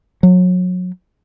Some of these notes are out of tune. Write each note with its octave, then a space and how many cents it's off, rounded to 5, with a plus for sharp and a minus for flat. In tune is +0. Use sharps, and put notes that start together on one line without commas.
F#3 -30